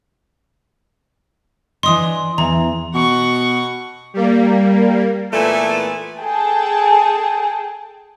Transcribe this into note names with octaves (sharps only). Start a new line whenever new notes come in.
E3 D4 D#5 C6 D#6
E2 E3 A#5
B2 F#5 C#6
G3 A#3
A#2 E3 A3 B3 A4 G#5
G#4 A4 G5 A5